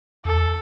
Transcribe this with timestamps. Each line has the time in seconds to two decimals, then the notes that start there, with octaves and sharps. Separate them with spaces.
0.25 E2 A4